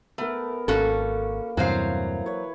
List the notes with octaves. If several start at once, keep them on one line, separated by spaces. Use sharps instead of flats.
A3 B3 A#4
G#1 A#3 C#4 F#4 A4
E2 G2 C3 E3 F#3 C5 F5
B4 C#5